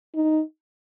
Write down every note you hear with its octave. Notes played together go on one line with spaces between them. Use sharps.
D#4